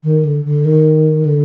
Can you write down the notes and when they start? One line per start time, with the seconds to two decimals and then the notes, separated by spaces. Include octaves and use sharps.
0.04 D#3
0.25 D3
0.45 D3
0.65 D#3
1.25 D3